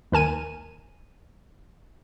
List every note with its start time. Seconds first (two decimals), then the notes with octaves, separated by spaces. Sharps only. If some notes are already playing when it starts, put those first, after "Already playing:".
0.12 D#2 A#4 G#5 D#7